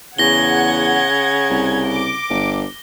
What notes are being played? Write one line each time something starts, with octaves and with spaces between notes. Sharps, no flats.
E2 C#3 F#5 G#6 A#6 G7
C2
D6
G1